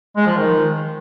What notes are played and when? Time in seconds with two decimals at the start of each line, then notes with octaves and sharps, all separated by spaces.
0.16 G#3
0.27 F3
0.37 D#3